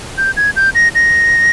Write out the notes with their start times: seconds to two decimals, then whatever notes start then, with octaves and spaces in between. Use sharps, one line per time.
0.18 G6
0.37 G#6
0.56 G6
0.75 A#6
0.95 A#6